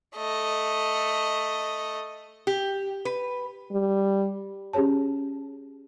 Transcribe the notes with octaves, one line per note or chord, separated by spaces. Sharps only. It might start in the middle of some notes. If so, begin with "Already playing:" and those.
A3 D#5
G4
B4
G3
C#4 G4 G#4 C#5 A5